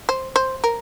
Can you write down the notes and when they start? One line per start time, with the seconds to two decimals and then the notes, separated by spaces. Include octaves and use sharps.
0.09 C5
0.36 C5
0.64 A#4